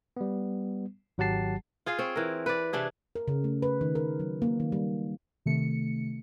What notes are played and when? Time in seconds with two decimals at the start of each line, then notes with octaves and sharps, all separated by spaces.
0.17 G3 B3
1.18 G#1 F#3 G4 F#5 A5 C7
1.86 F4 G#4 F5
1.99 C4 C#5
2.16 E3 A#4
2.46 B4 D5
2.73 C3 E3 D4 G#4
3.15 A#4
3.28 C#3
3.44 A3
3.62 B4
3.81 D#3
3.95 A#4
4.20 F#3
4.42 A#3
4.60 D#3
4.72 G3
5.46 C3 D#3 A3 C#7